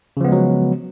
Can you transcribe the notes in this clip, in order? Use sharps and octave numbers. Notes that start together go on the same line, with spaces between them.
C#3 F3 F#3 G#3 B3